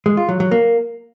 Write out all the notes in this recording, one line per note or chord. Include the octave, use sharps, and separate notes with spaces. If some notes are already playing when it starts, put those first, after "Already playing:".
G#3
F4
F#3
F#3
A#3